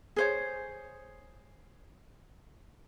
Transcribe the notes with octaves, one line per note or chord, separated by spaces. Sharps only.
G#4 C5 C#5